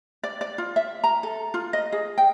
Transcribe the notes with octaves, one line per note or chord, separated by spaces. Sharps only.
D5
D5
F4
E5
A#5
A4
F4
D#5
G#4
G5